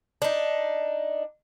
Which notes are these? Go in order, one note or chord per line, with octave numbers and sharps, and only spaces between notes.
D4 D#4